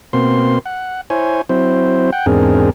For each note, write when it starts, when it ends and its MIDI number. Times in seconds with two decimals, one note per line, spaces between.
0.13 0.59 47
0.13 0.59 58
0.13 0.59 60
0.13 0.59 84
0.66 1.01 78
1.10 1.41 64
1.10 1.41 72
1.10 1.41 73
1.10 1.41 80
1.49 2.10 54
1.49 2.10 60
1.49 2.10 64
1.49 2.10 72
2.12 2.26 78
2.12 2.26 79
2.26 2.70 40
2.26 2.70 44
2.26 2.70 60
2.26 2.70 62
2.26 2.70 68
2.26 2.70 70